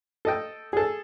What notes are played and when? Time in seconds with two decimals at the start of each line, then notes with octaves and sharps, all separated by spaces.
0.25 A4 D#5 G5
0.73 G#4 A4